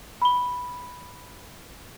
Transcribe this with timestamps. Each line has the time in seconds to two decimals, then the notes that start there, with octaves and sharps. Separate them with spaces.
0.22 B5 G7